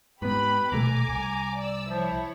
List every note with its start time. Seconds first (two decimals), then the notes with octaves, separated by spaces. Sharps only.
0.22 G#2 B3 G4 B4 B5
0.72 D#1 B2 A3 G#5 A#5 D6
1.08 C2
1.58 D5 E6
1.90 F3 E4 C#5